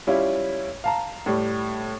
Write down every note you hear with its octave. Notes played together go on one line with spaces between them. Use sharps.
G3 C#4 E4 F4
F5 A5 A#5
A2 G3